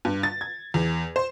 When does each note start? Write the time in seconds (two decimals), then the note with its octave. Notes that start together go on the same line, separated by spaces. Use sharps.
0.05 G2
0.23 A6
0.41 G#6
0.74 E2
1.16 C5